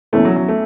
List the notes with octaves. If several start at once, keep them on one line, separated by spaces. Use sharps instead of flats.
E2 E3 A3 C#4 E4
F#3
F#3
A3